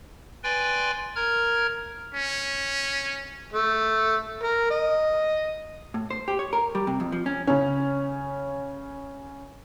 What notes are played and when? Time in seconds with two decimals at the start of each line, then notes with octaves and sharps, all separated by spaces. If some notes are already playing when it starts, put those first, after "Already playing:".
0.44 B4 D5 G5 G#5 C6
1.16 A#4 A#5 F6 G#6
2.14 C#4
3.53 A3
4.43 A#4
4.70 D#5
5.94 A2
6.11 C5
6.28 G4
6.39 C#5
6.53 A#4
6.75 G3
6.87 C3
7.00 F2
7.12 F3
7.26 C#4
7.47 C#3 C#4